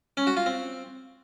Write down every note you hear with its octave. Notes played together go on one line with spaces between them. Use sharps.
C#4
F#4
F4
C4